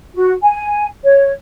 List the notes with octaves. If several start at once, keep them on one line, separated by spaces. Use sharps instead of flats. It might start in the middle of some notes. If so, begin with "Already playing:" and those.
F#4
G#5
C#5